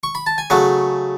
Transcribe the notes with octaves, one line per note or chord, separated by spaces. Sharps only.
C#6
B5
A5
G#5
C#3 F#3 A3 F#5